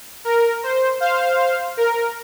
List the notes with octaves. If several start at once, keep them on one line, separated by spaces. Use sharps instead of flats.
A#4
C5
C5 F5
A#4